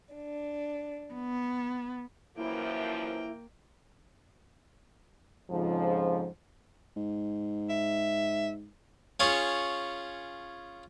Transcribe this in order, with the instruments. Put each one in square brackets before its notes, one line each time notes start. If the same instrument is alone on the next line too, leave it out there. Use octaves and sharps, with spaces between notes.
[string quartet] D4
B3
[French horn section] F#2 E3 F3 [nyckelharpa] A#3 G5 [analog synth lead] E4
[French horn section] F2 G#2 C#3 F3
[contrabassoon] G#2
[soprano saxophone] E5
[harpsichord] C#4 F4 G#4 C#5